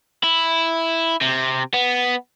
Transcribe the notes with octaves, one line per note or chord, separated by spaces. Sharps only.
E4
C3
B3